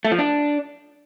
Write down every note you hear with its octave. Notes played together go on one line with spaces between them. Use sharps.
A3
F3
D4